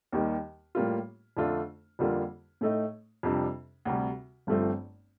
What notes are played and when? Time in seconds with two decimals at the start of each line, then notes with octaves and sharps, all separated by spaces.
0.12 D#2 D#3 G3 A#3
0.75 A2 G3 A#3 F4
1.37 F2 D3 A3 D4 F4
1.99 F2 D3 G3 A#3 F4
2.61 A2 A3 D#4
3.23 F2 C3 G3 D4
3.85 D2 C3 G3
4.47 G1 G2 F3 A3 C4